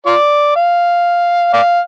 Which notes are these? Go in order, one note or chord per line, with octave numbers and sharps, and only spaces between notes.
F4 D5
F5
D5 F5